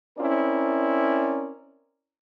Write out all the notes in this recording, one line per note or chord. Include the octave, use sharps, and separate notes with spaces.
C4 C#4 E4 A#4 D5